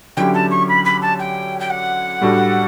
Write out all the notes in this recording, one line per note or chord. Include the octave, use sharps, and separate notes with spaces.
D3 F#3 C#4 E4 G4 G5
A5
C#6
B5
B5
A5
G5
G5
F#5
A2 G3 D4 F#4 A4